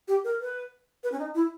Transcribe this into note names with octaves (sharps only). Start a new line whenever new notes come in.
G4
A#4
B4
B4
C#4
D#4
E4